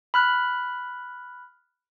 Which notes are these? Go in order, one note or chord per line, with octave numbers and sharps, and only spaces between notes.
B5 F6 F#6